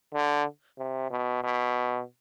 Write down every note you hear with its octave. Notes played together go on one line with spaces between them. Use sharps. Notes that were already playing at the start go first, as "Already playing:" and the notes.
D3
C3
B2
B2